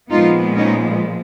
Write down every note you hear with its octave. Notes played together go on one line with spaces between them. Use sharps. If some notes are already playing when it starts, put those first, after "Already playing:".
A#2 F3 G#3 B3 D#4 F4
C#4 D#4